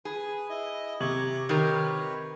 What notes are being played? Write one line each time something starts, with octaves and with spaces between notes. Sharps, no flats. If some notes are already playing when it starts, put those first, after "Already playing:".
G#4 B4
E4 D#5
C3 A#5 C#6 D6 G#6 F#7
D#3 G4 A#4 B4 C#5